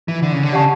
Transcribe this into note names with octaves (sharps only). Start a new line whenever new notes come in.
E3
D3
C#3
D3
C#3 G4 D5 F#5 A5 C#6